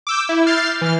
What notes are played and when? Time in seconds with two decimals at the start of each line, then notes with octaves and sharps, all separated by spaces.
0.07 D6 E6 G6
0.29 E4
0.47 F6 G6 A6 C7
0.81 E3 F6